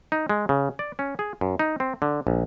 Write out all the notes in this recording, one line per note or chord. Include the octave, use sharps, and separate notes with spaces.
D#4
G#3
C#3
D5
C#4
G#4
F#2
D#4
C4
D3
A#1